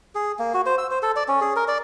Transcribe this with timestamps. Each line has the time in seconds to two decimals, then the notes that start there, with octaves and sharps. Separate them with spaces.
0.15 G#4
0.39 A#3
0.54 F#4
0.66 C5
0.78 E6
0.91 C5
1.03 A4
1.16 D5
1.28 C#4
1.41 G#4
1.56 A#4
1.68 D5